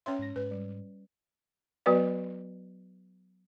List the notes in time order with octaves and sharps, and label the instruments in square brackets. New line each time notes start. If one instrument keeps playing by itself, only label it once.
[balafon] C#4 C#5 C6 [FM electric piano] E5 G5 F6
[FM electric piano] G#2 A#6
[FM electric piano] G#2 [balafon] B4
[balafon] G3
F#3 B3 F#4 B4 D5